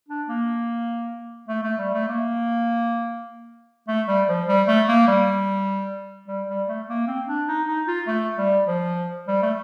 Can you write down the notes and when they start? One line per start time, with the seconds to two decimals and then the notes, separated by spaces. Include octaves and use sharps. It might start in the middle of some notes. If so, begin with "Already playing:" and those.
0.09 D4
0.28 A#3
1.48 A3
1.63 A3
1.78 G3
1.93 A3
2.08 A#3
3.88 A3
4.08 G3
4.29 F3
4.48 G3
4.68 A3
4.88 A#3
5.07 G3
6.28 G3
6.48 G3
6.68 A3
6.88 A#3
7.07 C4
7.28 D4
7.48 D#4
7.68 D#4
7.87 F4
8.07 A3
8.38 G3
8.67 F3
9.27 G3
9.42 A3